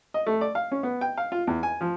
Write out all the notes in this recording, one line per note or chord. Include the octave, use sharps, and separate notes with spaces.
D#5
A3
D5
F5
C#4
B3
G5
F5
F4
E2
G#5
F3